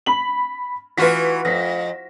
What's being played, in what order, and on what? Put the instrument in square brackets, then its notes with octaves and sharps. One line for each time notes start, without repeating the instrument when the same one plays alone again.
[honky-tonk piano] B5 F#7
[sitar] E3 F4 F#4 [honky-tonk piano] B4 B6
[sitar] F2 [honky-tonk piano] A#6 B6